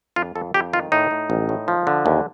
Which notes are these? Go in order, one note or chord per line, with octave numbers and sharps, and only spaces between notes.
F2 F4
F2 A4
F2 G4
D#3 F4
A2 D#4
A2
A1
A2
F3
D3
D#2